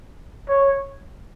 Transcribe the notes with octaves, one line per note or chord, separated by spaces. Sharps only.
C#5